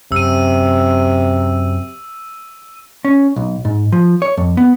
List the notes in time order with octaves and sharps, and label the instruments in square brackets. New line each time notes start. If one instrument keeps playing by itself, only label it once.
[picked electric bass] F#2 [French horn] C3 [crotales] E6 D#7
[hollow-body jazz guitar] C#4
B1
G#2
F3
C#5
F2
B3